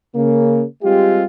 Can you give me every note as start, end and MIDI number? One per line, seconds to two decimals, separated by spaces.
0.14 0.63 49
0.14 0.63 58
0.82 1.23 55
0.82 1.23 56
0.82 1.23 60
0.82 1.23 65
0.82 1.23 67